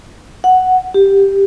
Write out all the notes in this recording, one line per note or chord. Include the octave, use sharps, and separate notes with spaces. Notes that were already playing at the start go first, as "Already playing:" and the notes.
F#5
G4